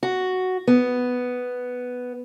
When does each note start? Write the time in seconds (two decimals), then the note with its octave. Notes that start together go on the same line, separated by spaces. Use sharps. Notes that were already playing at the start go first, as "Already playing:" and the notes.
0.03 F#4
0.67 B3